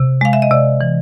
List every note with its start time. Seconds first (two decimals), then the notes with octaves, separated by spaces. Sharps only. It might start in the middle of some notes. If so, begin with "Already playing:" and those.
Already playing: C3
0.21 G#3 F5
0.33 E5
0.42 D#5
0.51 C3 D5
0.81 E3